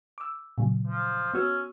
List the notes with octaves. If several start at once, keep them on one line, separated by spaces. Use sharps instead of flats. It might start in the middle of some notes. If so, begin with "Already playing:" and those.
D6 E6
A#2 C#3 F#3
F3
B3 C#4 F#4 E6